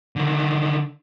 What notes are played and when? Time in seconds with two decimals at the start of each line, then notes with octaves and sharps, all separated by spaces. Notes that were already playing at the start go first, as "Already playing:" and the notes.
0.16 D3 D#3